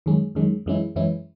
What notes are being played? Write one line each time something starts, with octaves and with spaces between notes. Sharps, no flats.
F#2 D#3 G#3 C#4
F#2 D#3 G#3 C#4
F#2 E3 G#3 C#4 E4
F#2 E3 G#3 C#4 E4